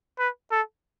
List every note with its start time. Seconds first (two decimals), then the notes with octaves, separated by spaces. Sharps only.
0.19 B4
0.51 A4